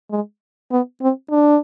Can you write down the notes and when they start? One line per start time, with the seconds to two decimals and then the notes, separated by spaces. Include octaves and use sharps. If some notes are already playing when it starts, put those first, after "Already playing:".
0.11 G#3
0.71 B3
1.01 C4
1.30 D4